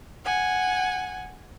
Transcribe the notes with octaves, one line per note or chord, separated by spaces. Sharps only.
F#5 G#5